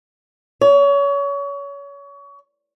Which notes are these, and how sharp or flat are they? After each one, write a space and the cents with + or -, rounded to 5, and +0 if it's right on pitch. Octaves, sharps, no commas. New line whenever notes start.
C#5 +30